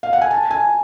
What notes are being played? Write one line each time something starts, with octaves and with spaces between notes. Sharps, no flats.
F5
F#5
G#5
A5
G#5